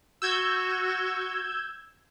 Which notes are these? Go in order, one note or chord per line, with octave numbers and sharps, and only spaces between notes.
F#4 E6 G6 G#6